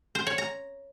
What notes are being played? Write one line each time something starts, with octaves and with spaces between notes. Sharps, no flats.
C5
C#5
A#5